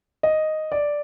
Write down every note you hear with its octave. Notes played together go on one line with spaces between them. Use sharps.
D#5
D5